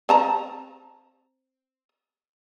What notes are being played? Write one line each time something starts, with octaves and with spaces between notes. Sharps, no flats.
C4 A5 A#5